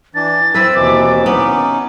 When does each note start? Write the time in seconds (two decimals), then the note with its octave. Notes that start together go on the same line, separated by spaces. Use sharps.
0.15 E3 D4 A6
0.54 C4 E4 B4 E6
0.75 D#2 B2 E3 D6
1.26 B3 C#4 D#4